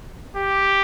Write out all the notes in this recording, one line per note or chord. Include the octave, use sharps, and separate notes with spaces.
G4